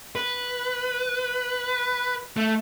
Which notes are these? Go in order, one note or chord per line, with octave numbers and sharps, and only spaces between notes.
B4
A3